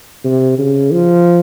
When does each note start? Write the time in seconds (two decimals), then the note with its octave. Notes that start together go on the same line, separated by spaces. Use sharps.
0.24 C3
0.59 C#3
0.92 F3